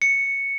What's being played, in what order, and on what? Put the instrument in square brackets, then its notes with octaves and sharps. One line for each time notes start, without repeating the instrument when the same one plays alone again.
[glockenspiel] C#7